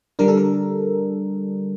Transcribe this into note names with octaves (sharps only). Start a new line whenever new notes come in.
D3 G3 D4 A#4
A4
A#4